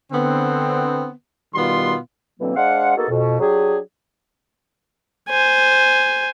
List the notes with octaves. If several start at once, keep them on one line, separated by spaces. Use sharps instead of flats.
D3 B3 C4
B2 D#3 G3 B3 F4 C6
B2 D3 E3 F#3 A#3 C4
G#3 D4 C5 F5 F#5
A#3 B3 D#4 F#4 G#4 A4
F2 B2
F#3 D4 G4 G#4
C5 G#5